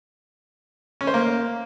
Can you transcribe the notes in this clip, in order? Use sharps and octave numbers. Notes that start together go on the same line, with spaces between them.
C#4
C5
A#3